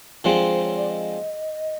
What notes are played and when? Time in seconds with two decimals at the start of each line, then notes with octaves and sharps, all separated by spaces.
0.24 D3 F3 G#3 C4
0.48 C5
0.62 C#5
0.76 D5
0.90 D#5